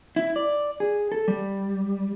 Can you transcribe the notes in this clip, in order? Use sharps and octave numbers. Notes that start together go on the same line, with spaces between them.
E4
D5
G#4
A4
G3